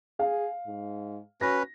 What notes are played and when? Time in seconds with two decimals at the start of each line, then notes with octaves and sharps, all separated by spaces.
0.19 G#4 F5
0.66 G#2
1.41 C#4 F#4 B4 A#6